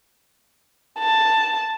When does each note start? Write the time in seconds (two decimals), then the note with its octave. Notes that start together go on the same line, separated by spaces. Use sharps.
1.00 A5